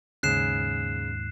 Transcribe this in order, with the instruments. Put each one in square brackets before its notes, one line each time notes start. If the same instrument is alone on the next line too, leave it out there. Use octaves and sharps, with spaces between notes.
[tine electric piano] D#2 G#2 [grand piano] C#3 [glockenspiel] F#6 C7 E7